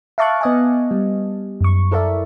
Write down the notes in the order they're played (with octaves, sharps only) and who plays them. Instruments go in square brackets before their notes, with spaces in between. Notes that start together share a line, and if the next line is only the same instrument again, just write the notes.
[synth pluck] E5 F5 A5 C#6 D6 F#6
B3 D#5 G#5
G3
F#2 C#6
E4 A4 A#4 D5 E5